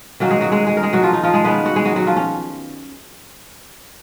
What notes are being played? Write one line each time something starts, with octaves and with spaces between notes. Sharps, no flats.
D#3 F#3 A#3 C#4 F#4
G#3 G#4
F#3 F#4
G#3 G#4
G#3 G#4
A#4
G#3 G#4
F#3 F#4
F3 F4
D#4
F3 F4
G#3 G#4
D#3 G#3 B3 C#4 B4
F#4 F#5
G#3 G#4
F#3 F#4
F#3 F#4
F3 F4
C#4